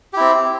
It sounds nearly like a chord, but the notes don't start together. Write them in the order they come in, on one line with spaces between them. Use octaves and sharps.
G4 E4 C4